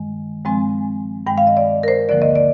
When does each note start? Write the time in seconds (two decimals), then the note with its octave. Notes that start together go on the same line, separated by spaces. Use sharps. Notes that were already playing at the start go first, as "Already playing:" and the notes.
Already playing: G2 D#3 G#3
0.45 G2 F3 G#3 C4 G#5
1.27 G2 D#3 G#3 G5
1.38 F5
1.47 D#5
1.57 D5
1.83 A#4
1.88 C5
2.08 D2 D3 F3 A#3 D5
2.22 D#5
2.36 D5